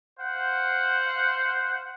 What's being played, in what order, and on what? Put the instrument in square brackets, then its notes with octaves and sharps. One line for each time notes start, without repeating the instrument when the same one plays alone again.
[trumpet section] C5 F5 F#5